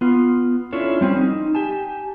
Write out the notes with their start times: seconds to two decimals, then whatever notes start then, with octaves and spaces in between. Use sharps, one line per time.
0.01 B3 F4
0.73 C#4 D4 E4 F4 A4 C#5
1.01 G3 C4 C#4
1.16 D#4
1.55 G4 G#5 A5